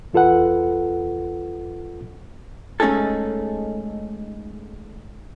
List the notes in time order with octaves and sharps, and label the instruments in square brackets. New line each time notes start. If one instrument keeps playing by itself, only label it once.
[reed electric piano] E2 F4 A4 B4 F#5
[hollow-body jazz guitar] G#3 A3 C#4 D#4 G#4 A4